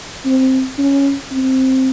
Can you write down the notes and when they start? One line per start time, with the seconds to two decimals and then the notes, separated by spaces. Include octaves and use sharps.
0.25 C4
0.78 C#4
1.31 C4